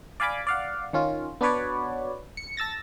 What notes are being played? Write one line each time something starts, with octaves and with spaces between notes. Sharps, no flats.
D5 F5 G#5 B5 D6
D5 F5 F#5
D#3 C#4 F4
B3 D4 F#4 B4 C#5 D5
C#7
A5 E6 A6 A#6